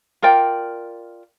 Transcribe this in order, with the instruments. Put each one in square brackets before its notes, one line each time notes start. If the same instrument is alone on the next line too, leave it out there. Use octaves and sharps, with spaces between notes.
[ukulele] F4 A#4 D5 G5